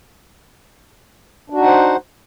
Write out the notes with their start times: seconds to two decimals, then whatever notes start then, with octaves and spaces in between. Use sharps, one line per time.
1.50 D4
1.54 F#4
1.58 D#4
1.62 F#5
1.66 C5